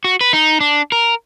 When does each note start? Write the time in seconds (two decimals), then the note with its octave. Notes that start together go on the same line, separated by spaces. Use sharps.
0.04 F#4
0.21 B4
0.33 D#4
0.61 D4
0.92 A#4